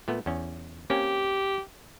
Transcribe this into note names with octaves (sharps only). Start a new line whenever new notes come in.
A#2 A3 B3
E2 C#4
A#3 C4 C#4 G4